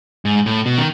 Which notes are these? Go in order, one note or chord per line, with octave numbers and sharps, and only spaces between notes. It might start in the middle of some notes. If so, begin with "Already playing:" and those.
G#2
A2
B2
D#3